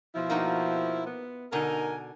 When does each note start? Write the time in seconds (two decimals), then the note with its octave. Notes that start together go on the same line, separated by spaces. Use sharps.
0.15 B2 F3 E4
0.30 A#3 D#4 F#4
1.06 B3
1.52 B2 D3 D#4 A#4 G#5